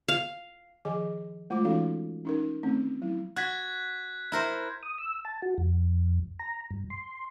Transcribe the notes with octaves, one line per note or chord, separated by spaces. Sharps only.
F5
D#3 F3 G#4 D#5 G#5 D6
G#3 A3 F4 C5 D6
E3 C#4 D#4 F#4 A4 F5
C#4 D#4 A#4
D#3 A3 C4 C#4
F#3 E4
F#4 F#6 G#6 B6
E4 A#4 C5
D#6
E6
A5
F#4
F2
A#5
G2
C6